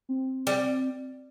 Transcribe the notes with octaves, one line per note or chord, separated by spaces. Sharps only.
C4
G3